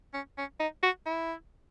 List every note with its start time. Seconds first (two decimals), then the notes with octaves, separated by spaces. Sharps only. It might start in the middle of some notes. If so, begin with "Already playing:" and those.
0.14 C#4
0.38 C#4
0.60 D#4
0.83 F#4
1.06 E4